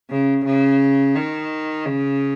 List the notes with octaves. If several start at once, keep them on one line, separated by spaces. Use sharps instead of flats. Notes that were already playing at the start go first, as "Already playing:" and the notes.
C#3
C#3
D#3
C#3